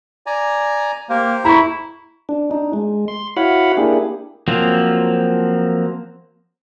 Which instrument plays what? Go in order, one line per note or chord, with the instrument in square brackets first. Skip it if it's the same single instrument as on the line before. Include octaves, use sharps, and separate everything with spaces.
[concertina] D5 G#5 A#5
[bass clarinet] A#3 [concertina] G4 C5
[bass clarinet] E4 [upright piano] A#5 C#6
[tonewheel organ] D4
D4 D#4
G#3
C6
E4 F#4 C#5 F5 F#5 B5
A#3 D4 E4 G4 G#4
[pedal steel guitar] F3 F#3 A#3 C4